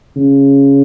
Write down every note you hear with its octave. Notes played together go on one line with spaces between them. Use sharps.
C#3